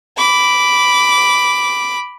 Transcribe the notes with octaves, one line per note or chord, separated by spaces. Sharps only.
B5 D6